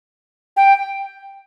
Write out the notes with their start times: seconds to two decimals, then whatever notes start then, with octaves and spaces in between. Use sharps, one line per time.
0.57 G5